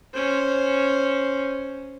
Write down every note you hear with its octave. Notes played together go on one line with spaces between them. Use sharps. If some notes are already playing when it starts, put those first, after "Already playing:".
C#4 C5